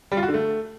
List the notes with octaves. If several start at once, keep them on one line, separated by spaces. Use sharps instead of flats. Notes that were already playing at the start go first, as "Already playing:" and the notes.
G3
F4
F#4
D3
A3